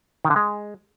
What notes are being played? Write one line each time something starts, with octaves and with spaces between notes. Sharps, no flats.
D#3
D3
G#3